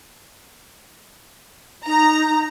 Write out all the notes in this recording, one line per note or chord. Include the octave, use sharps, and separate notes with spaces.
D#4 A#5